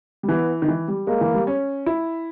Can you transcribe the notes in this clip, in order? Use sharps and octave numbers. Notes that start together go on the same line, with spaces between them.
G3
E3 B3
D#3
E3
G3
G#3 A#3
E3
G3
C#4
E4